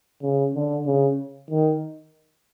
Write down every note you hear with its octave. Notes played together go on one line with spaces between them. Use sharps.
C#3
D3
C#3
D#3